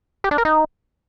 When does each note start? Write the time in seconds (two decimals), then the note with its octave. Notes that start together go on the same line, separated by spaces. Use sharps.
0.24 G4
0.31 D4
0.38 A#4
0.45 D#4